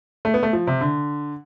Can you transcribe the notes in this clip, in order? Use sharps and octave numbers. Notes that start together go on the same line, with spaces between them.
A3
B3
A3
F3
C3
D3